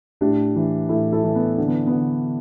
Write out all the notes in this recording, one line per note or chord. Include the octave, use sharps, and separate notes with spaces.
A2 D4 G4
E3
A2 E4 A4
E4 A4
E3
B3
D3 D4
B3
B3
D3